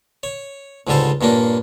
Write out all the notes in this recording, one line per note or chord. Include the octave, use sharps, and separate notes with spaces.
C#5
C#2 G#2 D3 G3 A4 C5
G2 A#2 A#3 C#4 D4